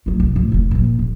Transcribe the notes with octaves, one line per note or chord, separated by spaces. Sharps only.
F#3 A3
C2
A2 F3
F1 E3
A#2 F3
D#1